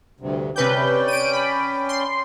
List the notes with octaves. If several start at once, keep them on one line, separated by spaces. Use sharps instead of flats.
D2 G2 C3
C3 C#4 B4 D5 G5 G6
D7 D#7
B5
C6